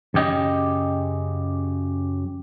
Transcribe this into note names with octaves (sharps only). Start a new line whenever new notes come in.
F#2 C#3 G4 D#5